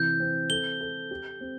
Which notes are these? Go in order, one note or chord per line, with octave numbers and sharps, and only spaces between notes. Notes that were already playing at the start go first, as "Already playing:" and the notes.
Already playing: C3 E3 G6
C4
A4 G7
A4
G4
C4